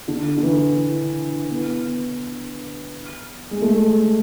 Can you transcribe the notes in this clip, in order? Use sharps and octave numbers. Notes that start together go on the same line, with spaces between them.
D3
D3
E3
B3
G#3
A3